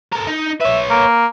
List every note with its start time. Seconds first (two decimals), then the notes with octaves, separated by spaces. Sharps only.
0.13 A4 A#4
0.27 D#4
0.61 B4 C#5 E5
0.90 A#3